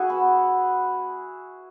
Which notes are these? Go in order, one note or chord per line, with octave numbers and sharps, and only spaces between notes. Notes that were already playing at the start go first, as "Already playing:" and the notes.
Already playing: E4 F#4 G#4
B3